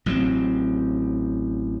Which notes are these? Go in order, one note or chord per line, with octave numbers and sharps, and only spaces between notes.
A1 F#3 A#3 C4